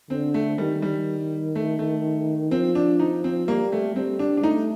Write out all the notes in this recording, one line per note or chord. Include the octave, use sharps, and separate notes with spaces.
D3 C4
A3
D#3 G3
G3
A3
A3
F3 C4
D4
D#4
C4
G3 A#3
A3
G3 C4
D4
D4
A3 D#4